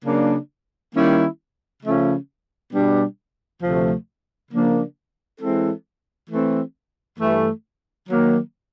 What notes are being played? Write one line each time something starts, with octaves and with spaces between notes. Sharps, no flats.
C#3 F#3 A#3 D4
D#3 G3 A#3 C#4 E4
C#3 F3 A3 C#4
B2 G3 B3 D4
D2 C3 F3 A3
C#3 F3 A#3 D4
E3 G#3 C4 E4 A4
E3 A3 C4
G2 E3 A3
D#3 F#3 A#3